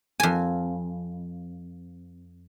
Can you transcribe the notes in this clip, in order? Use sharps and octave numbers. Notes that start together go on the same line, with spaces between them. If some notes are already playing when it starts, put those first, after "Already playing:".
F2 G#5